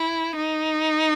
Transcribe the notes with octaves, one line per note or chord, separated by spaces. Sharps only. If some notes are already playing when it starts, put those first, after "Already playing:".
Already playing: E4
D#4